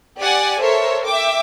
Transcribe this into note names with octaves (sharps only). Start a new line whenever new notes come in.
G4 D5 F#5 G#5
A4 A#4 C5 C#5 E5
E5 G5 D6